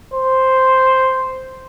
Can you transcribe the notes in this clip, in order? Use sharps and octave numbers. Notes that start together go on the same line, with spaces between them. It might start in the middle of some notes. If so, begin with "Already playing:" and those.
C5